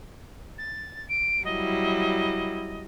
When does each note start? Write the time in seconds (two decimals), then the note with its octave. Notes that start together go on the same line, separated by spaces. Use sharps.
0.58 A6
1.08 D7
1.44 F#3 G3 E4 D#5